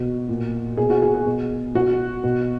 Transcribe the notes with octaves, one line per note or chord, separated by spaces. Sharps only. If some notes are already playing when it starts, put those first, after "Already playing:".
Already playing: B2 F#4
A#2
B2 G#4
F#4
G#4
G#4
B2
B2 F#4
B2